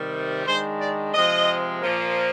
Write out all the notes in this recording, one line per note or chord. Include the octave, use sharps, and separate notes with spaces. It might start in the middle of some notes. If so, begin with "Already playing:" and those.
Already playing: C3 D#3 G3
D#3 G#3 D4 C5
D5
C3 F3 G#3 C4 D#5
A#2 F3 A#3